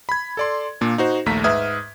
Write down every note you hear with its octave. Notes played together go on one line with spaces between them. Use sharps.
B5 G#6
A4 D5 C6
A#2 A#3 D4
D#4 F#4 C5
A#1 D#2 A3 A#5 B6
G#2 B4 E5 D#6 F6 G#6